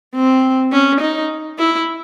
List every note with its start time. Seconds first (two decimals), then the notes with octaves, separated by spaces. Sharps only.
0.15 C4
0.72 C#4
1.01 D#4
1.58 E4